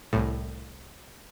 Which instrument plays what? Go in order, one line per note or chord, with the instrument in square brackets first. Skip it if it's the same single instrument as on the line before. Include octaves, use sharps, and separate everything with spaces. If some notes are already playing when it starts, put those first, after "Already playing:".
[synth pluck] C2 A2